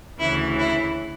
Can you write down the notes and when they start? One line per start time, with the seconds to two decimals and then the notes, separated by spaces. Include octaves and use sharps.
0.19 D2 C#3 E3 E4
0.59 E4